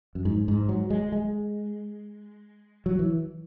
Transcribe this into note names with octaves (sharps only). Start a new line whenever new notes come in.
F#2
G#2
G#2
F#3
G#3
G#3
F#3
E3